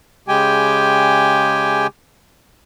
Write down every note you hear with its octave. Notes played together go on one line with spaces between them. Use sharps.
C#3 G#3 G4 G5 G#5